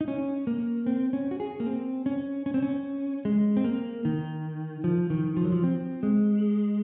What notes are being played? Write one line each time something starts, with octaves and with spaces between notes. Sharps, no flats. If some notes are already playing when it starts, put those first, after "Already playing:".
D#4
C#4
A#3
C4
C#4
F#4
G#4
A#3
C4
C#4
C#4
C4
C#4
G#3
C4
A#3
D#3
F3
D#3
F3
F#3
F3
C4
G#3